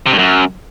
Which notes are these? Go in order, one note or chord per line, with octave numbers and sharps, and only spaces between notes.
C3
G2
F#2